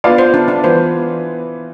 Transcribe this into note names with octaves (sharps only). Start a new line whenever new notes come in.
B3 D4 F4 B4 D5 F5
C5
D4
D4
E3 B3 F4 B4 C5